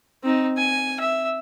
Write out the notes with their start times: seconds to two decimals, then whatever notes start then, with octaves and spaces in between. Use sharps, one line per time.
0.23 C4 D#4
0.57 G#5
1.00 E5